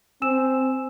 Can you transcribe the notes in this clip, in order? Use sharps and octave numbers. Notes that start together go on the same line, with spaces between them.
C4 G#5 E6 E7